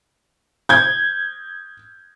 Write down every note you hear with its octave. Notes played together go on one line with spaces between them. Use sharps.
G6 G#6